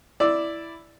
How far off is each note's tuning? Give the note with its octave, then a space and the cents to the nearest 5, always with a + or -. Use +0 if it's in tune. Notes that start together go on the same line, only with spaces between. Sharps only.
E4 +0 D5 +0 E6 +0